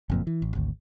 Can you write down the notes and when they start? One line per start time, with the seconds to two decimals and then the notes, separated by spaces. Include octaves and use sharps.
0.10 F#1 F2 A#2
0.27 E3
0.42 A1
0.55 G#1 D2